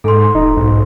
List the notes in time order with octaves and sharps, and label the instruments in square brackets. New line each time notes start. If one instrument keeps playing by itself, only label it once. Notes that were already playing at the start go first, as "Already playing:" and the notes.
[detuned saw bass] G#2 [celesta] A4 C6
[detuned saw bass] D#1 [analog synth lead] D#4
[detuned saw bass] B1 [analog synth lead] G#2